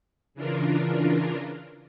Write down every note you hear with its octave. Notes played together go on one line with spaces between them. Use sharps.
C#3 E3 D4 F4 A#4